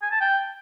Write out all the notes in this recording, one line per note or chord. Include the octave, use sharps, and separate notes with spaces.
G#5
A5
G5